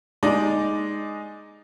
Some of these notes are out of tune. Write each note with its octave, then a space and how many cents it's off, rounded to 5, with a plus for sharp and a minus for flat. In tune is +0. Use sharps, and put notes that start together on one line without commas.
G#3 +0 D#4 +0 D5 +0